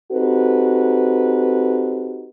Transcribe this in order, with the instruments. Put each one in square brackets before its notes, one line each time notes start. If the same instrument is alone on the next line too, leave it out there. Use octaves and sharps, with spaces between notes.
[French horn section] C4 D#4 F#4 G4 A4 B4